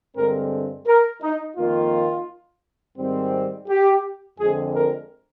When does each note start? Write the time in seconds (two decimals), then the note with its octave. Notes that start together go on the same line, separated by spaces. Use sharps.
0.16 G2 D3 G#3 C4 A#4
0.87 A#4
1.22 D#4
1.57 F2 D#3 A#3 F4
2.98 G#2 D#3 G3 C4
3.68 G4
4.39 F2 D3 G#3 C4 G#4
4.74 A#4